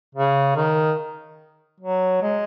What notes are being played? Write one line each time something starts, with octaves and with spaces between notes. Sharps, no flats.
C#3
D#3
F#3
G#3